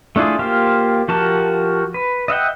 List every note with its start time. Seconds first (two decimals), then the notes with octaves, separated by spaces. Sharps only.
0.16 A3 D4 E4 F4 G#4
0.39 A#3 F4 G4 C5 F5
1.08 F3 F#4 G4 A#4 A5
1.94 B4
2.28 D#5 E5 F#5 G5